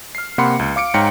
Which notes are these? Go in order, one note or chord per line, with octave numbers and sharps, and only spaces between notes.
F6 C7
C3 A#3 F#5 B5 C6 C#7
C#2
F5 D6 C#7 D7
G#2 C#5 F5 G5 A#5 C#7